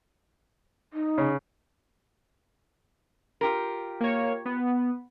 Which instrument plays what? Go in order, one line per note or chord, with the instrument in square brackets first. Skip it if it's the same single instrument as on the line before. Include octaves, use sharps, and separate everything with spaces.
[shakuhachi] D#4
[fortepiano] C#3
[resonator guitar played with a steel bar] F4 G4 A#4
[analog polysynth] A#3 C#5
B3